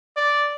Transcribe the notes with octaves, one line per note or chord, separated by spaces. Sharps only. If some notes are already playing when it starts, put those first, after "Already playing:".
D5